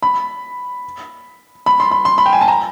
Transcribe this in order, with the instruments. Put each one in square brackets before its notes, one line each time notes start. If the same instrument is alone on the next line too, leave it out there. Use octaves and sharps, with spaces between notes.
[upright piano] B5
B5
C6
B5
C6
B5
G5
G#5
A5
A#5